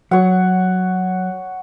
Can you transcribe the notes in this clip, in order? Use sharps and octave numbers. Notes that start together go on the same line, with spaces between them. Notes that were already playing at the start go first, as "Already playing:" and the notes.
F#3 C#5 F#5